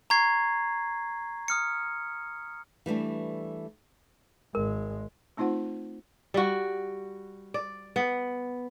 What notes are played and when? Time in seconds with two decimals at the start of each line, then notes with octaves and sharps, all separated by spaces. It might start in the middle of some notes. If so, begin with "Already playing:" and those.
0.10 A#5 C#6 G#6 C7
1.48 D#6 F6 C#7
2.86 E3 G3 A3 D4
4.55 G#1 G#3 A#4
5.37 A3 C4 D#4 F4 C5 F#5
6.34 G3 F#4
7.54 D5
7.96 B3